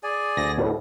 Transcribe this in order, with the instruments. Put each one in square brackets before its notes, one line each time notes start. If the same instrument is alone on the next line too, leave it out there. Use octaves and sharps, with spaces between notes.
[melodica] G#4 D5 G#5
[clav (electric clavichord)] D2 [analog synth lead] A#6
[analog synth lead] A2